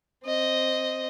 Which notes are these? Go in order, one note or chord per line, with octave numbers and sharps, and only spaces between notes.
C4 D#5